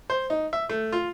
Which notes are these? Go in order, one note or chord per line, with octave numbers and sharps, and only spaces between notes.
C5
D#4
E5
A3
F4